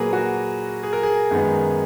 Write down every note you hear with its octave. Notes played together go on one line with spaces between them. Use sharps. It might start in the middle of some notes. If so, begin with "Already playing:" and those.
Already playing: A#2 F#3 A#3 G#4 A#4 B4
F#4
G#4
A#4
G#4
F#2 D#3 G#3 B3